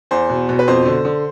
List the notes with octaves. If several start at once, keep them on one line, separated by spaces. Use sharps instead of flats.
E2 C5
B2
B2
B4
F2 C5
D3
D3